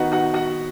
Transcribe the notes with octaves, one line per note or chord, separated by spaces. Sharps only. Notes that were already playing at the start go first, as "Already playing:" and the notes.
Already playing: D#3 B3 D#4 F#4 F#5
F#4 F#5
F#4 F#5